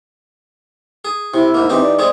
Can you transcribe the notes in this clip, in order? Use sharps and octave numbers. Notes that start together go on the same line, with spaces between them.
G#4
C3 E4
G#2 A#3
E3 C4 D#4 G4
D5
G#3 C4 G#4